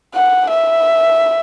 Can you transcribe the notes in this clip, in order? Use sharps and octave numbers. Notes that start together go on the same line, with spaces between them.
F#5
E5